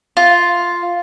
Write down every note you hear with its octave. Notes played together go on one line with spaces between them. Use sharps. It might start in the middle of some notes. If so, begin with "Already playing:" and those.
F4